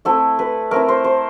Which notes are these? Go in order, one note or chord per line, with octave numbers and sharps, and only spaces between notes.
A3 C4 E4 A4
B4
A3 C4 E4 A#4
C5
C5